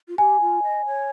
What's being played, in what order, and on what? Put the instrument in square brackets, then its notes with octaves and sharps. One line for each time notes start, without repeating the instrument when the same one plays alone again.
[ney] F4
[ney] G4 [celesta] G#5
[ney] F4
D#5
C#5